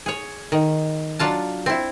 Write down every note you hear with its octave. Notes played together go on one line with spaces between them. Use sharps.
G#4 C#5
D#3
F#3 D4 F4 A5
C4 E4